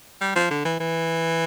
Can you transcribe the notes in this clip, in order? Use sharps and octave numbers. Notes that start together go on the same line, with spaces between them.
G3
F3
D3
E3
E3